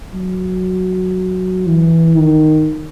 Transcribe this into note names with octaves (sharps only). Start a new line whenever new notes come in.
F#3
E3
D#3